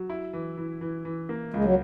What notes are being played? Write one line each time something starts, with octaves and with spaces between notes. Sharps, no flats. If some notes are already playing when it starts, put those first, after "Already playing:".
Already playing: F#3
E4
E3
E3
E3
E3
A#3
C#2 G#3
F#3